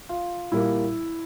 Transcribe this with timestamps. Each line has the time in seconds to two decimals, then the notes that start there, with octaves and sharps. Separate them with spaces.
0.09 F4
0.52 A#2 G3 A#3 E4